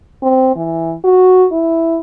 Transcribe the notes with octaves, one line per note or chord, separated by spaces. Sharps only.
C4
E3
F#4
E4